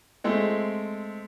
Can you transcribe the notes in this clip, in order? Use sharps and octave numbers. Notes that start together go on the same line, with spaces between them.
G#3 A3 C4